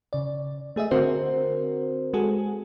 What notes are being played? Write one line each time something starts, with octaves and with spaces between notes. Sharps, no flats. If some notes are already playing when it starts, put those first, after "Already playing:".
C#3 D5
A3 G#4 D#5 E5
D3 C4 F#4 A#4 C5
G#3 F#4 G#4 A4